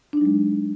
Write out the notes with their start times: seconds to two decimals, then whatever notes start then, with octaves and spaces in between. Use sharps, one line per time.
0.13 D4
0.17 D#4
0.21 F#3
0.25 G#3